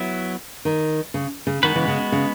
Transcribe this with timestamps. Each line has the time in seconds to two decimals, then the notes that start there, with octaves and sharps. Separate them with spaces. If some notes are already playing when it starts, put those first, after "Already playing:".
Already playing: F#3 B3 E4
0.65 D#3
1.14 C#3
1.47 C#3
1.63 D#3 G#3 B3 F#4 B4
1.75 C#3 E3
1.88 C#3
2.12 C#3